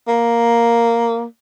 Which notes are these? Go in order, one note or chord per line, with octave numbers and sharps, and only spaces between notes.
A#3